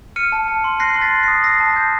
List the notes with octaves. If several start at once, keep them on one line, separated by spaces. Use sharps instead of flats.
F6 C#7 D#7
A5
A5
C6
F#6 A#6 C7
C6 C7
A6 B6
C6
A#6 C7
D#6
E6 A#6 C7
A5
G6